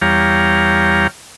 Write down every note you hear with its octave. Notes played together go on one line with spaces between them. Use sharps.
E2 G3 G4 C#5 F5 A#5